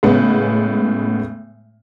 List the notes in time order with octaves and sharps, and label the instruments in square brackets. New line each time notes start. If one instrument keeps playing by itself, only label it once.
[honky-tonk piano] A2 C#3 G#3 B3